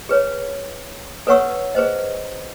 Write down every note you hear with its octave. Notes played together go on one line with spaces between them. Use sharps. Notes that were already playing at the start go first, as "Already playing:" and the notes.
G#4 B4 C#5
A4 B4 C#5 F#5 C#6 E6
G#4 B4 C5 D#5